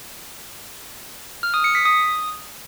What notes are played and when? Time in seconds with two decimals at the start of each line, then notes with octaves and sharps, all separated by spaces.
1.43 F6
1.54 D#6
1.64 C#7
1.75 B6
1.85 D#6